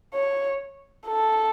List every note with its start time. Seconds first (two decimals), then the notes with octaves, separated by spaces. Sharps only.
0.14 C#5
1.07 A4